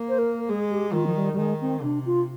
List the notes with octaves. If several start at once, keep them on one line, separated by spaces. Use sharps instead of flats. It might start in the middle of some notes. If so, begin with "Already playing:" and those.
Already playing: A#3
C5
A#4
G#3 G#4
G4
D#3 F4
F3
G3
G3
D#3 G#3
C4
C3 D4
F4